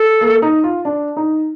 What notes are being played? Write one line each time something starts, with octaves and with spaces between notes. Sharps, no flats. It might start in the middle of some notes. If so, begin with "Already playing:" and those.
Already playing: A4
A#3
D#4
F4
D4
D#4